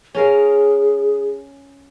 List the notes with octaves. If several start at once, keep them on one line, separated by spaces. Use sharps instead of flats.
C#4 G#4 A#4 F5